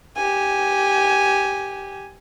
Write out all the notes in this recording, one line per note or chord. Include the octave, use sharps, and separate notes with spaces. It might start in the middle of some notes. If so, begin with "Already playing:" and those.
G4 G#5